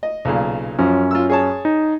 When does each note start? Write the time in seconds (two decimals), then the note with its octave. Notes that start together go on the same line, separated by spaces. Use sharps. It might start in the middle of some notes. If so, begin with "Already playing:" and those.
0.03 D#5
0.25 B1 A#2 C#3
0.79 F#2 F3 C#4
1.11 F4 E6
1.30 G#4 C#5 A5
1.65 D#4